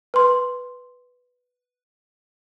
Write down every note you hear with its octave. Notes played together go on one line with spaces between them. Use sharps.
B4 C6